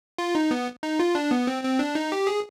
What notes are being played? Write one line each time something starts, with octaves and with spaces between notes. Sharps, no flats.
F4
D#4
B3
D#4
F4
D4
B3
C4
C4
D4
D#4
G4
G#4